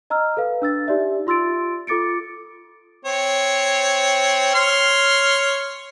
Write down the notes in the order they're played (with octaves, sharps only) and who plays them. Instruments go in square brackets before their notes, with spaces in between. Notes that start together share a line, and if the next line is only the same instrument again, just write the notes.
[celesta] D#5 A#5 E6 F6
A4 B4 F5
D4 E6 A6
D#4 G4 D5 E5
F4 C6 E6 A6 D7
F4 A4 D6 A6 C#7 D7
[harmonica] C4 C#5
C#5 C6 F6